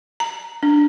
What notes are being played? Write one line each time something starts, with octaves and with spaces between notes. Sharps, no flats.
A#5
D4